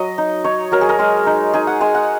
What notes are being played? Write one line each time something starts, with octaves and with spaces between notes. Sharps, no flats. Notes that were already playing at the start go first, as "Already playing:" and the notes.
Already playing: F#3 D#5
D#4
D#4 C#5
F#3 A#4
G#4
A#4
G#3 G#4
D#4
D#4 G#4
F#5
G#3 G#5
F#5